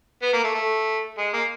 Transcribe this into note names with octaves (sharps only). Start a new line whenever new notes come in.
B3
A#3
A3
A3
G#3
A#3